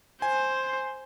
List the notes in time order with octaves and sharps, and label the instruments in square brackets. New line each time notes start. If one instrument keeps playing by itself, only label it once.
[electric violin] C5 [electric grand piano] G#5